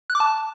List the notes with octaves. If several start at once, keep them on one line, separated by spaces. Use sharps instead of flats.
F#6
D6
A5